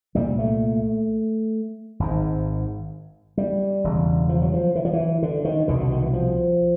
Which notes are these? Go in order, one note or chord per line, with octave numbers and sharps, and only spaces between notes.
C2 A#2 G3
A3
G#1 G#2
G3
E1 E2 C#3
F3
F#3
F3
E3
F3
E3
D3
D#3
C2 B2 D3
D3
D#3
E3
F3